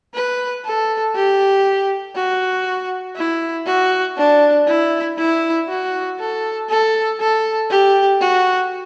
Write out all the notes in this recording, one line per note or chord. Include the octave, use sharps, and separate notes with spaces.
B4
A4
G4
F#4
E4
F#4
D4
E4
E4
F#4
A4
A4
A4
G4
F#4